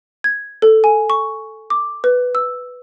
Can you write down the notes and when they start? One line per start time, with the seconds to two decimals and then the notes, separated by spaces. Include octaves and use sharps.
0.24 G#6
0.62 A4
0.84 G#5
1.10 C#6
1.70 D6
2.04 B4
2.35 E6